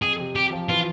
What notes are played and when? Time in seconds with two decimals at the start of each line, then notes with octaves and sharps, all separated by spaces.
0.02 F2 G#4
0.19 C3
0.36 C3 G4
0.52 F3
0.69 E3 F4